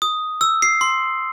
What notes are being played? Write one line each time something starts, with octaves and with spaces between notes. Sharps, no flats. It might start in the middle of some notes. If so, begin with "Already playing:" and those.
D#6
E6
C7
C6